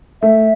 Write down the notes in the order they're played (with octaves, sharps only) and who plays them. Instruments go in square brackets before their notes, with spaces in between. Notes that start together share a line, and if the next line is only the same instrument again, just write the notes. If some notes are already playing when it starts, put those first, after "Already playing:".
[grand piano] A3 [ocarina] E5